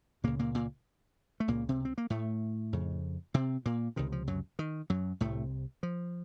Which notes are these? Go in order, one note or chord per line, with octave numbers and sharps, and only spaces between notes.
C#2 A#2 C#3 A#3
A#2 A#3
A#2 A#3
A3
C#2 A#2 C#3 A#3
C3 C4
C4
A#3
A2 A3
F2 C#3
C3 C4
A#2 A#3
C#2 C3 D#3
F3
F#2 F#3
D#3
F#2 F#3
C2 A2 C3 A3
F3